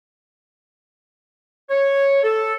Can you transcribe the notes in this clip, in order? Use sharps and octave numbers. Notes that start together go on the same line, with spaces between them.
C#5
A4